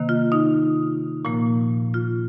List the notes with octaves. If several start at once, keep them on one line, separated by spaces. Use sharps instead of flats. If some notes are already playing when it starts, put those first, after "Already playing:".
Already playing: C3 D#3 A#3
F4
D#4
A#2 F3 A#3
F4